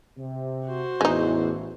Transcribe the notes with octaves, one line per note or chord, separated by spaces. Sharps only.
C3
F#4 C5
A1 E2 E3 G#3 D#4